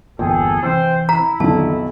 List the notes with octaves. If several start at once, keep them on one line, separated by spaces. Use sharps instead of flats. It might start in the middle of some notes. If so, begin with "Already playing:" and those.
G1 E2 A#2 G#4 A4 G5
C3 E3 C4 C5 G5 E6
E4 A#5 B6
B1 F2 D3 D#3 A5